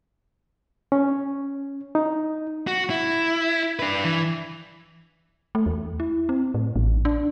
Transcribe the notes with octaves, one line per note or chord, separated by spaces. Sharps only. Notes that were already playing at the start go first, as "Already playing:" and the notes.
C#4
D#4
F#4
E4
D4 B4
E3
A3
E2
E4
C4
A2
A1
D4